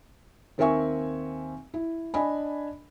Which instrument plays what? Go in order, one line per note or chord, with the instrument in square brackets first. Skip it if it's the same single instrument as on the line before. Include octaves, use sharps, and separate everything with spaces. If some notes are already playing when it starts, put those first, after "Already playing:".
[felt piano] D#2 C4 A#4 E5 G#5 C#6
E4
D4 D#5 G#5 B5